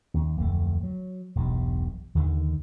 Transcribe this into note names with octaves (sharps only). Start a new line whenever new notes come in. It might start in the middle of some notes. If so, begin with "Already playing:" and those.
D#2
D1 F2 E3 A3
F#3
E1 B1 G2
D#2 D3 D#3